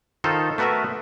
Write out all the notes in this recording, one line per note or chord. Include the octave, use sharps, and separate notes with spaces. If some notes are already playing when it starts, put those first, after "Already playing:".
D#3 D#4 F4 A4 C5
A3 B3 F#4 A#4 B4 E5